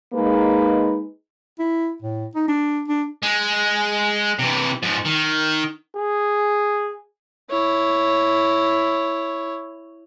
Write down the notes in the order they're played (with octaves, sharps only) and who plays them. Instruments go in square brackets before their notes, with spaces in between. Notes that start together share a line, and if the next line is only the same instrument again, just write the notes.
[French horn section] G#3 A#3 D#4 G#4 B4
[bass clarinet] E4
A2
D#4
D4
D4
[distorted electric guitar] G#3
C3 E3
G#2 F3
D#3
[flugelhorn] G#4
[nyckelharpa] E4 C#5